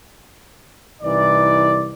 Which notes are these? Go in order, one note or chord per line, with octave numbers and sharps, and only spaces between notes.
C2 E3 D#4 D5